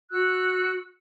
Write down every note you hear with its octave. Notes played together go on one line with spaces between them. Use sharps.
F#4 E6 F#6